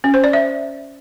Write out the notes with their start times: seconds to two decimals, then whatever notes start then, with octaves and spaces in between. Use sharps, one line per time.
0.04 C#4
0.14 C5
0.24 D5
0.33 E5